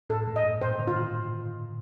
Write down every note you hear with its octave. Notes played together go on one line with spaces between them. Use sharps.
A2 A4
A2
D#5
G2
A#2 C5
D3
F4
D#3